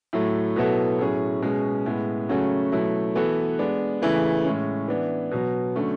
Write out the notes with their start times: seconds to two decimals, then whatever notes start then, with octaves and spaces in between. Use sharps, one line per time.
0.13 A2 F#3 A3
0.56 B2 F#3 B3 E4 A4
0.99 A2 F#3 C#4 G#4
1.42 B2 G#3 C#4 G#4
1.86 A2 G#3 B3
2.29 C#3 F#3 A3 C#4 F#4
2.72 B2 F#3 A3 E4
3.15 E3 B3 F#4 A4
3.59 G#3 B3 D4
4.02 C#3 E3 A3 E4 G#4
4.45 A2 G#3 C#4
4.88 E3 B3 D4
5.31 B2 F#3 B3
5.76 D3 F#3 A3 C#4